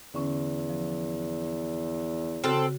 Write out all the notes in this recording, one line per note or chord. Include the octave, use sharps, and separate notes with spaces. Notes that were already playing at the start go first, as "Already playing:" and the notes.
E2 D3 C#4
F3
C#3 C4 F#4 A4 F6